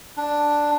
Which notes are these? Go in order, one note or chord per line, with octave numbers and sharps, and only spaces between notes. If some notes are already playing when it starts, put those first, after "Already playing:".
D4